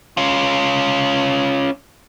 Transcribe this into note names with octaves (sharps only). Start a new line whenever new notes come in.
C#4 F4